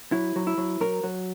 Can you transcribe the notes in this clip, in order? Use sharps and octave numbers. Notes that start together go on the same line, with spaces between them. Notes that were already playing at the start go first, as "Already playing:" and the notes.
F#3 E4
F#3
E4
F#3
F#3 A#4
F#3